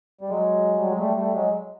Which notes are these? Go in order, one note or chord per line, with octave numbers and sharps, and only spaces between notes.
G3
F#3 G#3
G3
G#3
G3 A3
G3 A3
F#3 G#3